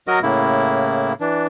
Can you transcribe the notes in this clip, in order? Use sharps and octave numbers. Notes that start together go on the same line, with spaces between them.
F#3 F#4 A#4 D#5
A2 C#3 A#3 E4
E3 D4